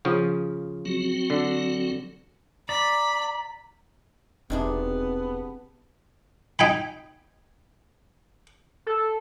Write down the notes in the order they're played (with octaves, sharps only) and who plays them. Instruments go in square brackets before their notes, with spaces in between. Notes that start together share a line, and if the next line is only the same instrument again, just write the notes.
[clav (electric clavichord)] C#3 F3
[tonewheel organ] F#3 C4 F#4
[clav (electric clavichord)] D3
[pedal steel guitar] D5 [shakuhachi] A#5 [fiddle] B5
[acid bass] E1 [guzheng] C3 D4 G#4 [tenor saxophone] B3 [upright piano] C4 D#4
[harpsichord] D#4 G5 G#5 B5
[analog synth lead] A4